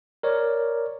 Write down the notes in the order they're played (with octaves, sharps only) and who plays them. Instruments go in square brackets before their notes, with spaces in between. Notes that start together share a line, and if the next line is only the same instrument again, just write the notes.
[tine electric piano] A#4 C#5 D5